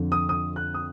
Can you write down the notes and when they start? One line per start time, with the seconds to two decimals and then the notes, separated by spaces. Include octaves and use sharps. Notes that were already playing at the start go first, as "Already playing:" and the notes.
Already playing: F2 D3 F3
0.12 D#6
0.29 D#6
0.56 F#6
0.74 D#6